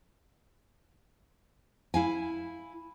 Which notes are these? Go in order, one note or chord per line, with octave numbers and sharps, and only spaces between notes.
E4 F5 G#5